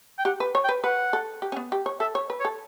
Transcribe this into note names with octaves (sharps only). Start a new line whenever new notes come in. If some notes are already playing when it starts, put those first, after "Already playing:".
G5
G4 F#5
B4
C#5
G5
B4
B4 F#5
A4
G4
C#4
B3
G4
C#5
A4 E5
C#5
B4
C#5
A4